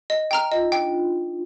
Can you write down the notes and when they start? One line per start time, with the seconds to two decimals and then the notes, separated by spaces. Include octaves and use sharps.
0.10 D#5
0.31 G5 A#5 F6
0.52 F4 D#5
0.61 D#4
0.72 D4 G5